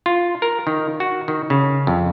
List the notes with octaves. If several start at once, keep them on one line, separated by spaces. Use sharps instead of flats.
F4
A#4
D#3
F#4
D#3
C#3
F2